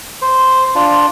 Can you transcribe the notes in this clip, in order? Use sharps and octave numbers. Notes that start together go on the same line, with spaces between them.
C5
D4 F4